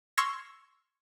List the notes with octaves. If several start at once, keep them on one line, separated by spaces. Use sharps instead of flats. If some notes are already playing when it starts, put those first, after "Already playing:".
C6 C#6 E6 F6 G#6 A#6